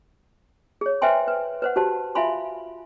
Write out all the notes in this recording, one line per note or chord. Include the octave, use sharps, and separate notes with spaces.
G#4 C#5
B4 C5 E5 G5 G#5 C6
B4
B4 C5 F#5
F#4 G4 C5 A5
F4 E5 F5 G#5 B5 C6